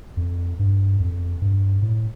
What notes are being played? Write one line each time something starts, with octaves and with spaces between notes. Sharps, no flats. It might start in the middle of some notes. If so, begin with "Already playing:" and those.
F2
G2
F2
G2
A2